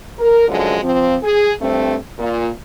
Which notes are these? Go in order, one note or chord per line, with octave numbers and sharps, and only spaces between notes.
A#4
F#2 D3 F3 G#3
F3 C4
G#4
G2 A3 C4
A#2